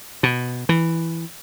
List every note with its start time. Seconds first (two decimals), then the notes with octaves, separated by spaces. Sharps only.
0.23 B2
0.69 E3